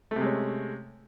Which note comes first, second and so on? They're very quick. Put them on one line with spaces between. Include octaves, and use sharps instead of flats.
A3 C3 G#3 C#4